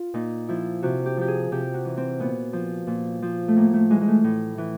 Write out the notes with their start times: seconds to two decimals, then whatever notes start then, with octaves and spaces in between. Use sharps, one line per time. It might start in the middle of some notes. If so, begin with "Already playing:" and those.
Already playing: F4
0.14 A#2 D#4
0.48 F3 E4
0.82 C3 F#4
1.06 G4
1.17 F3 G4
1.28 G#4
1.52 C3 G4
1.74 F#4
1.85 E3
1.97 C4
2.20 A#2 B3
2.53 F3
2.87 A#2
3.22 F3
3.48 A3
3.56 A2 A#3
3.73 A3
3.90 E3 G#3
4.01 G#3
4.08 A3
4.24 A2
4.58 E3